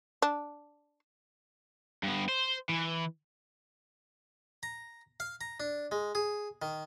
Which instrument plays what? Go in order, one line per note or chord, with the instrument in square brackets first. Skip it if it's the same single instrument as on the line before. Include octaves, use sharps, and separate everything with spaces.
[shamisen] D4
[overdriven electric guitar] G2 B3
C5
E3
[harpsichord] A#5
F5
A#5
D4
G#3
G#4
D#3